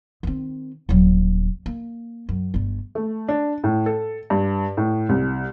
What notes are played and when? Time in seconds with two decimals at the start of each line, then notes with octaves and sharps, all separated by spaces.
0.23 D#3 C4
0.89 D#1 F#3
1.66 A#3
2.29 F#2
2.54 G1 A3
2.95 A3
3.28 D4
3.64 A2
3.86 A4
4.30 G2
4.77 A2
5.09 C2